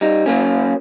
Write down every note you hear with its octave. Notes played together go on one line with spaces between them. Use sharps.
G3 D#4
F#3 A#3 C#4